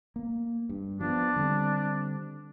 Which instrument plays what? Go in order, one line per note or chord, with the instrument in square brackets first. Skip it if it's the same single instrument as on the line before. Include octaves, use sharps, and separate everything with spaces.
[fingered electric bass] A#3
G2
[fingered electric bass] F3 B3 [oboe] D4
[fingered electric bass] D3 G3 C4